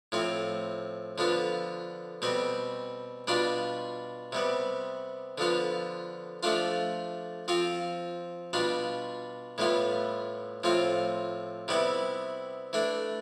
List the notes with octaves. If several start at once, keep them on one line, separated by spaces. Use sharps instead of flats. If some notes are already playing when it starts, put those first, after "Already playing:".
A2 F3 C4
D3 F3 B3 F4
B2 G3 C4
B2 G3 D4 F4
C3 G3 B3
D3 F3 B3 F4
F3 A3 D4 F4
F3 C4 F4
B2 G3 D4 F4
A2 E3 G3 B3 F4
A2 F3 C4 F4
C3 G3 B3 E4
E3 A3 D4